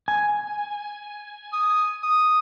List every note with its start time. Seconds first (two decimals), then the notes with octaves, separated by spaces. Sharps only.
0.08 G#5
1.53 D#6
2.03 D#6